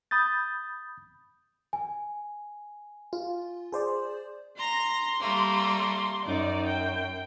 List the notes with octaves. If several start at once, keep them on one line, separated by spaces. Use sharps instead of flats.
B5 D#6 G6 A6
G#5
F4
G#4 C5 D5
A#5 C6 A#6
G3 A3 A#3
F#2 D#4 D5
G5